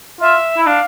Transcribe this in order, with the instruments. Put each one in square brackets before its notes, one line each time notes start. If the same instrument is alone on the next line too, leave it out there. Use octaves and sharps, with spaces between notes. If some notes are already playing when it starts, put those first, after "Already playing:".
[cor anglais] F4 [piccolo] E5
[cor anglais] E4
[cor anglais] D4 [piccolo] F5